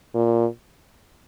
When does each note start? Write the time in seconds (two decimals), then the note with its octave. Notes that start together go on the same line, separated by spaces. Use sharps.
0.14 A#2